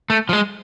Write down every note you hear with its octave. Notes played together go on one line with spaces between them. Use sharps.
A3
F3
G#3